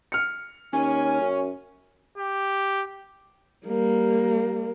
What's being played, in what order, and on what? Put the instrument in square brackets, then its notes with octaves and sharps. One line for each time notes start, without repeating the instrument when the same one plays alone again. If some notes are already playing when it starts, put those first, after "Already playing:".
[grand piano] F6 C#7
[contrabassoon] D#2 [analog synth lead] C#4 [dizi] G#5
[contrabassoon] F#2
[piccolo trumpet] G4
[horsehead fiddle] G3 A#3